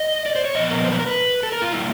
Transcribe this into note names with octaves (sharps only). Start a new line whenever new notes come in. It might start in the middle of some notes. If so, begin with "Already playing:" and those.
Already playing: D#5
D5
C5
C#5
A#2 F3 B3 D#5
A#4
C5
B4
A#4
B4
A4
A#4
F4
D3 G3 A#3 E4